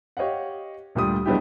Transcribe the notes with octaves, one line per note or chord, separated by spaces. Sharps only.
G4 C#5 D#5 F5 F#5
D2 A#2 G3 D#6
F#3 G#3 B3 D4 E4 G4